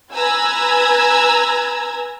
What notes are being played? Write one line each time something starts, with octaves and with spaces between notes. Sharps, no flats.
B4 G#5 A#5 E6 G#6